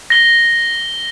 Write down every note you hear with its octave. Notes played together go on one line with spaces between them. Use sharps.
A#6 G7